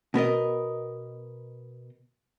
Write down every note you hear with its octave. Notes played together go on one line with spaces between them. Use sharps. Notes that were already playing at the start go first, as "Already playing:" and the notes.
B2 B3 A#4 D#5